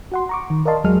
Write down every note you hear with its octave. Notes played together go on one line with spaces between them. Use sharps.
F#4 F#5 C6
A#5 C#6 D6
D#3
A#4 D5 D#5 F5 A5 C6
E2 F#3 G#3 G#4 D#5 F6